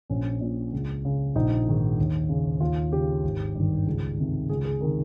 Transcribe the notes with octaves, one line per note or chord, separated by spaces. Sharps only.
A#1 C#4
A#2
C#2
C#3
A#1 D#4
G#2 D#3
D#2
C#3
D#2 F4
C#3 G4
G#1
G2 D#3
C#2
C3 D#3
C#2 G#4
G#4
C3 D#3 A#4